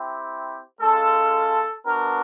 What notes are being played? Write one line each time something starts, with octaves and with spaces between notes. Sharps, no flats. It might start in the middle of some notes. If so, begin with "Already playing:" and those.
Already playing: C4 E4 G4
G#3 C#4 F4 A4
B3 D4 F#4 A#4